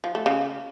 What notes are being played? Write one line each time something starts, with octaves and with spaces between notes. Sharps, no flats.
F3
A3
C#3